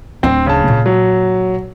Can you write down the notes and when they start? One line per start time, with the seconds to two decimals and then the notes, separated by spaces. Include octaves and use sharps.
0.23 D1 C4 D4
0.46 C#3 A5
0.68 A#2
0.86 F#3